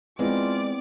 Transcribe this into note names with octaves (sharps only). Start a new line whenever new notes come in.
G#3 B3 C4 E4 F4 D5 D6